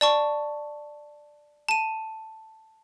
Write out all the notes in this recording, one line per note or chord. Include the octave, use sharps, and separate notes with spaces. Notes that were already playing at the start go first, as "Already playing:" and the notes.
D5 A5 C#6
A5 D#7